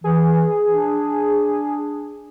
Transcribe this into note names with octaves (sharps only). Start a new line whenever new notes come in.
E3 G#4
D4